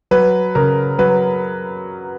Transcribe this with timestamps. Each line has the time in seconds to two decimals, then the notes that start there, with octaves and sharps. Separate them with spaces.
0.11 F#3 B4
0.55 C#3 A#4
0.98 F#3 B4